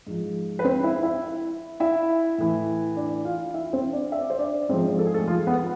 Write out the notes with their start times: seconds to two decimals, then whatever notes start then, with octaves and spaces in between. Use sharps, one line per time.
0.07 G#2 F3
0.59 B4
0.64 C4 C5
0.83 E4 E5
1.03 E4 E5
1.80 E4 E5
2.38 A2 E3
2.96 D4 D5
3.25 F4 F5
3.54 E4 E5
3.73 C4 C5
3.92 D4 D5
4.12 E5
4.21 D5
4.30 C5
4.39 D4 D5
4.69 G#2 F3 C4 C5
4.99 A4
5.06 G#4
5.14 A3 A4
5.28 F3 F4
5.47 B3 B4